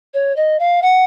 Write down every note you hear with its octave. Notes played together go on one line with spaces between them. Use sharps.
C#5
D#5
F5
F#5